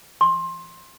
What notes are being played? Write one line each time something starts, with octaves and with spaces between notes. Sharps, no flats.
C6